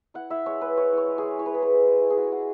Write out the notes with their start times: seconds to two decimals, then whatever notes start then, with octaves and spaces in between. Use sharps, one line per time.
0.14 E4 F#5
0.30 E4 E5
0.46 G#3 C#5
0.61 G#3 B4
0.77 E4 C#5
0.93 E4 C#5
1.08 G#3
1.18 G#3 G#4
1.38 E4 C#5
1.46 B4
1.54 E4 G#4
1.62 B4
1.69 G#3
1.86 G#3
2.01 E4
2.10 G#4
2.16 E4 F#4
2.32 G#3 F#4